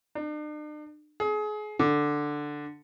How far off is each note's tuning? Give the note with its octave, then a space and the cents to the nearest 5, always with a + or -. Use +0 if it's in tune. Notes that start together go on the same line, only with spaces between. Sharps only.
D4 +45
G#4 +30
D3 +5